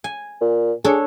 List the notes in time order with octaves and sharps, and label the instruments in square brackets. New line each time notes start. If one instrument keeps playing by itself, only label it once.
[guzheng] G#5
[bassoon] A#2
[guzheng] D4 A4 C#5 [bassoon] G#4